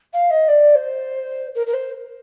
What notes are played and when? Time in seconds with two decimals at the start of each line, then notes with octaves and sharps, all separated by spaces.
0.13 F5
0.30 D#5
0.48 D5
0.75 C5
1.54 A#4
1.66 A#4
1.73 C5